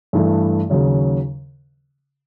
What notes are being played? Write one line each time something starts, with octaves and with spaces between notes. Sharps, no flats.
G2 E3 A3
D#2 C#3 F#3